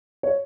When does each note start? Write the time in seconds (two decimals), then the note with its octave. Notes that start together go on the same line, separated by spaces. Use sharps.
0.23 C#5